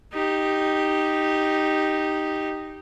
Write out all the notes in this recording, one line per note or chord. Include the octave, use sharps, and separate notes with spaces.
D#4 G4